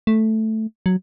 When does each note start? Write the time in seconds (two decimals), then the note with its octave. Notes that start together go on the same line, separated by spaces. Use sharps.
0.07 A3
0.86 F#3